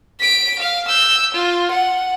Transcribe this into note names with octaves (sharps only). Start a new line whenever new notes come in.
B6 D7
F5
E6 G6
F4
F#5